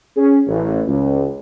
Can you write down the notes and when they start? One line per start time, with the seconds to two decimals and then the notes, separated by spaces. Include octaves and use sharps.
0.16 C#4 G#4
0.47 A1
0.87 C#2